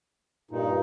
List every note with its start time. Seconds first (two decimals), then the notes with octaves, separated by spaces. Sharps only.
0.51 G2 A#2 D#4